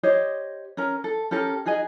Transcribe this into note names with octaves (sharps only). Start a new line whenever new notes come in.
G4 C5 C#5 D#5
C#4 A#4 A#5
A4
C#4 G4 A4 A#4
D#4 F#4 G#4 D#5